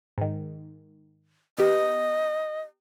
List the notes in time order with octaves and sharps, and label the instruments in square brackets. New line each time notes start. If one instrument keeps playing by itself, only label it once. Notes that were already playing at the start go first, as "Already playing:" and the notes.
[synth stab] G#2 D#3
[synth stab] B3 G4 [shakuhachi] D#5